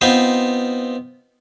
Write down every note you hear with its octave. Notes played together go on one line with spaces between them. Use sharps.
B3 C4 D#4 F4 B4 C5